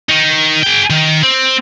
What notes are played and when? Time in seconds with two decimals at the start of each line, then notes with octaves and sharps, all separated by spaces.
0.09 D#3 D#4
0.63 G#4 G5
0.90 D#3
1.23 C4